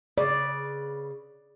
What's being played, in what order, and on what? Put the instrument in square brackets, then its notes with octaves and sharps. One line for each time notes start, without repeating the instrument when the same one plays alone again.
[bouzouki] C#3 B4 [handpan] D5